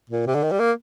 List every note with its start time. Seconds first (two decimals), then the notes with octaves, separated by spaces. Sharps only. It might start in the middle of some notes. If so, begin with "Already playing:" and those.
0.10 A#2
0.27 C3
0.35 D3
0.43 D#3
0.52 G3
0.60 A#3